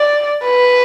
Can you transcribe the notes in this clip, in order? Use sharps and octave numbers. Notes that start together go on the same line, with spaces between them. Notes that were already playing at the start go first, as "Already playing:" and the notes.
Already playing: D5
B4